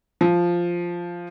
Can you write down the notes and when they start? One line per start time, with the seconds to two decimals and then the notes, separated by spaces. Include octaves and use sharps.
0.21 F3